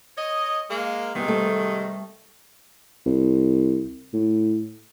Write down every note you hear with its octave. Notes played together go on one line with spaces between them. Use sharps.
C#5 D#5
G#3 A#3
G#2 C3 D#3 G3 B3 G#4
G3 A3 A4
C2
A2